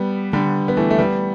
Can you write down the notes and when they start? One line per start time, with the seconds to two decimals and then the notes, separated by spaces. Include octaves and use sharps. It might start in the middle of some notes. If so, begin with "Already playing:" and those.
Already playing: G3 B3
0.33 D3 G3
0.68 B3
0.77 E3 A3
0.90 A3
0.98 G3 B3